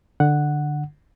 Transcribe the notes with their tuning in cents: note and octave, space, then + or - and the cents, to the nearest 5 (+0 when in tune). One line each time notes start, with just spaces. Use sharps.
D3 +10 F#5 +0